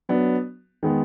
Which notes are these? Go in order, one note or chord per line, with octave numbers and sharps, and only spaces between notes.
F#3 B3 D4
D#3 G#3 B3